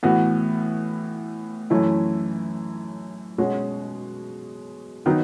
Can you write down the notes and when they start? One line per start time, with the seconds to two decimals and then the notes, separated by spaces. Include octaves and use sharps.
0.03 A2 E3 B3 F#4
1.70 F#2 E3 A3 C#4 E4
3.38 B2 G#3 C#4 F#4
5.06 D#3 F#3 B3 D#4